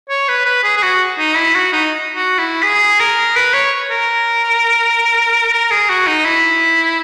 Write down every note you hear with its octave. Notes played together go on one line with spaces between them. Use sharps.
C#5
B4
B4
G#4
G#4
F#4
D#4
E4
F#4
D#4
F#4
E4
G#4
A#4
B4
C#5
A#4
A#4
G#4
F#4
D#4
E4